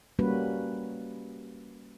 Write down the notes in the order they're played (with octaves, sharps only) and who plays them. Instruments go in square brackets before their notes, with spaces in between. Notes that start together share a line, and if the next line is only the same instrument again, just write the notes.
[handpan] G3 A#3 C#4 F#4 B4